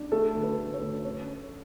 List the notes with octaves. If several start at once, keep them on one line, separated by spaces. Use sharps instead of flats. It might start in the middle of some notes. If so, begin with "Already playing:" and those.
Already playing: D4
A3 A4
D2
B4
A3
C#5
D2
C#4 C#5